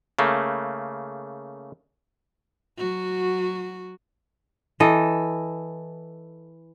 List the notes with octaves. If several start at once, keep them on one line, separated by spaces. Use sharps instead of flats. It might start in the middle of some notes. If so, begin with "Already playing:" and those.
C#3 A3 A#3
F#3 F#4
E3 A4 D#5